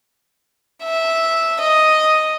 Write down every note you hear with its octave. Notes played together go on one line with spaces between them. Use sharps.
E5
D#5